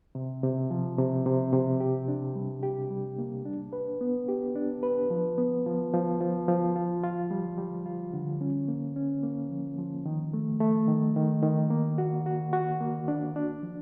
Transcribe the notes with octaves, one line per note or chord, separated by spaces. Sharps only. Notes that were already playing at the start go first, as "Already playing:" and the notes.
C3
C3
F3
C3
C3
C3
G4
D4
G3
G4
G3
A#3
D4
B4
B3
G4
D4
B4
F3
B3
F3
F3
F3
F3
F4
F4
G3
G3
F4
D3
C#4
A#3
C#4
A#3
F3
F3
D#3
A3
A3
D#3
D#3
D#3
A#3
F#4
F#4
F#4
A#3
D4
D4
F3